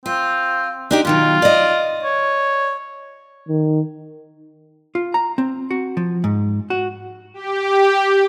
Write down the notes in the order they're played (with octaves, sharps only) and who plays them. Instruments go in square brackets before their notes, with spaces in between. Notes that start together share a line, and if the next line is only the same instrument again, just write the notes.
[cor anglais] C4 [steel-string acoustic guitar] F4
[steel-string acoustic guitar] D4 D#4 G4
[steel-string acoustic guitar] B2 D#3 F#3 [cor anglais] F4
[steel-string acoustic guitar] D5 D#5
[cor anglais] C#5
[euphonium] D#3
[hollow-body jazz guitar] F4
A#5
C4
F#4
F3
G#2
F#4
[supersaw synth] G4